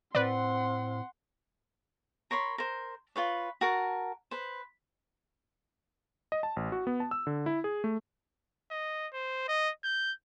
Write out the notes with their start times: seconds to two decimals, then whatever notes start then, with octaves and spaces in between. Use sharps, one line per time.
0.15 A2 C4 B4 D5 F#5 C6
2.31 A#4 C#5 B5 C6
2.58 A#4 C5
3.16 F4 B4 C#5
3.61 F#4 A#4 A5
4.31 B4 C5
6.32 D#5
6.43 A5
6.56 A1
6.72 F#4
6.87 B3
7.00 A5
7.11 E6
7.27 D3
7.46 E4
7.64 G#4
7.84 A3
8.71 D#5
9.13 C5
9.48 D#5
9.84 G6